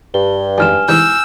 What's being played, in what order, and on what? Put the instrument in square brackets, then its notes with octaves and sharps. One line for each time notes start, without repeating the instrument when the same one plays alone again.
[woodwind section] G2 [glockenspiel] G7
[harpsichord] F2 G#2 G3 [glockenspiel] G#5 F6 E7
[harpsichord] G#2 C3 E3 [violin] E6 [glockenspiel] G6